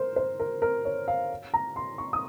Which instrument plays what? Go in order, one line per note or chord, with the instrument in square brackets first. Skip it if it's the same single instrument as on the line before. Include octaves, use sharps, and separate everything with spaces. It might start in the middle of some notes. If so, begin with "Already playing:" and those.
Already playing: [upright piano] A#4 C5
C5
A#4
A#4
C#5
F5
A#5
C6
C#6
D#6